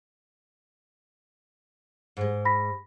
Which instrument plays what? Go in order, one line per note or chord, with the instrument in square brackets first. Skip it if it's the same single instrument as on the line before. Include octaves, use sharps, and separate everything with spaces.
[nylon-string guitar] G#2 G#3
[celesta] B5 A#6 B6